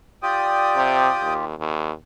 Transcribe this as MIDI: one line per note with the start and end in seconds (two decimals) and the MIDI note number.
0.23 1.45 65
0.23 1.45 67
0.23 1.34 74
0.23 1.34 79
0.23 1.34 87
0.76 1.08 48
1.22 1.56 39
1.59 1.91 39